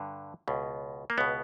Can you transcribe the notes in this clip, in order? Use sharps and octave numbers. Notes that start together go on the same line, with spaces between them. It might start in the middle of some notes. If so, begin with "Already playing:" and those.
Already playing: G2 D3
C#2 B2
A#3
C#2 B2 B3